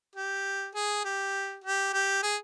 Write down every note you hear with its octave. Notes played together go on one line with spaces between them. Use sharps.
G4
G#4
G4
G4
G4
G#4